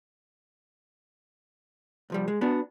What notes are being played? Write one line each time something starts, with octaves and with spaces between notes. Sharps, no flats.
C2 F3 G3
G#3
B3 D4 F#4